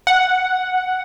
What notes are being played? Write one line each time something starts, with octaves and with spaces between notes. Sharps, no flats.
F#5